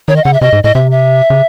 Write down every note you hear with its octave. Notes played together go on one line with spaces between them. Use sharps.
D#3 C#5
D#5
C#3 F#5
E5
C3 D#5
G#2
A2 D#5
C3 E5
E5
C#3